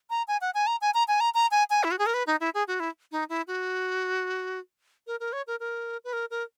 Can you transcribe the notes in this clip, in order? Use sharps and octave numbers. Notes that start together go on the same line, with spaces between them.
A#5
G#5
F#5
G#5
A#5
G#5
A#5
G#5
A#5
A#5
G#5
G#5
E4
F#4
G#4
A#4
B4
D#4
E4
G#4
F#4
E4
D#4
E4
F#4
A#4
A#4
C#5
A#4
A#4
B4
A#4
A#4